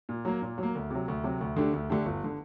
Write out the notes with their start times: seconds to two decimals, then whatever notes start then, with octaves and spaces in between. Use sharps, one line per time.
0.09 A#2
0.25 F#3 A#3
0.42 A#2
0.58 F#3
0.63 A#3
0.75 D2
0.90 C3 F#3
1.08 D2
1.24 C3 F#3
1.41 D2
1.57 D3 A3 D4 G4
1.73 D2
1.90 D3 A3 D4 G4
2.06 G1
2.24 D3